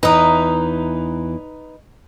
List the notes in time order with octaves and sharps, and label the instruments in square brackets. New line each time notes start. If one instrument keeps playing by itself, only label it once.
[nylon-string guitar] E2 E3 [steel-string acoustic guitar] D#4 B4 [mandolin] A#5 D#6